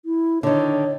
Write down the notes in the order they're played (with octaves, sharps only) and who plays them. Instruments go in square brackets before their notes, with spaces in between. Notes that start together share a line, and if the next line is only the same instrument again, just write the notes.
[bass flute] E4
[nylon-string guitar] D3 D#3 [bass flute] C#5